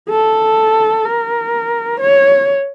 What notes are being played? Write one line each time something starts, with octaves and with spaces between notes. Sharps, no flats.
A4
A#4
C#5